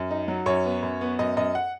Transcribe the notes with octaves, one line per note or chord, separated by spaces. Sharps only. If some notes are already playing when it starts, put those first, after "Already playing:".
Already playing: F#2
D#4
F#3
F#2 C#5
B3
F#2
B3
F#2 D#5
F#2 D#5
F#5